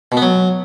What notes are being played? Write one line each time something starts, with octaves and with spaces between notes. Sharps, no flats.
B2
B3
F#3